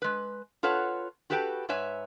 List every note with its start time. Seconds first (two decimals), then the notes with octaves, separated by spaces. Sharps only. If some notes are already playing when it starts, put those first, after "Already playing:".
0.02 G#3 B4
0.63 F4 A4 B4 C#5 F#5
1.30 F#4 G4 A4 B4 F#5 G5
1.69 G#2 B4 C#5 E5 G#5